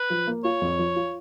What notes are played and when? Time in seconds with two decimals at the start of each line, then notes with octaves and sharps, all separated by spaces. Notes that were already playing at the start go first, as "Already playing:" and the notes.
Already playing: B4
0.10 F3
0.27 A#3
0.44 F4 C#5
0.61 F2
0.79 F3
0.96 F4